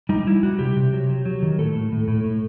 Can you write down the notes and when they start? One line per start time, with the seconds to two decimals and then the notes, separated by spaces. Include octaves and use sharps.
0.09 G3 D#4
0.27 G3 E4
0.43 G3 F#4
0.59 C3 G4
0.76 C3
0.93 F#3
1.09 F#3
1.25 F#3
1.43 D#3
1.58 A2 A4
1.75 A2
1.92 A2
2.08 A2
2.24 A2